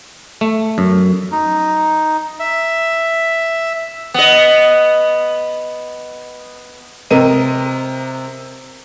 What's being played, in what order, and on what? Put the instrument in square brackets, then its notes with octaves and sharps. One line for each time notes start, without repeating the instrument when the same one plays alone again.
[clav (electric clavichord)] A3
F#2
[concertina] D#4
E5
[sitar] B3 D#5
[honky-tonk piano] C3 A#4 D#5 D#7